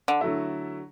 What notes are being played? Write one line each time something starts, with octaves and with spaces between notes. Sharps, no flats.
D3
D3 F#3 A3 E4